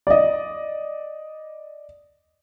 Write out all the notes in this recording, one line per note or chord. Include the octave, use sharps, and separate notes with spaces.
D5 D#5